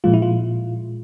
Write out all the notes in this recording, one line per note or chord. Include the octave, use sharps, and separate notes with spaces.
A#2 F3 G#3 F4
E4
F4